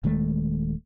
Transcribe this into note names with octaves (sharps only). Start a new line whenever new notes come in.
D#1 D#3 G#3 A3